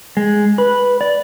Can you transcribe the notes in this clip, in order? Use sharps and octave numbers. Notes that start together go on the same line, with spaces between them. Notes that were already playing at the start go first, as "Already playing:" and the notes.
G#3
B4
D5